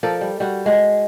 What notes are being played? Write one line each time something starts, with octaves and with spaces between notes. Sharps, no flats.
F3 A4 A#4 D5
G3
G3 F#4
G#3 F#4